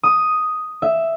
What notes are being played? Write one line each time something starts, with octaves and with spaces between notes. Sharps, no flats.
D#6
E5